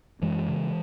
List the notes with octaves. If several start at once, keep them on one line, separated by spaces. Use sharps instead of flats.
F#2 E3 G#3
C#3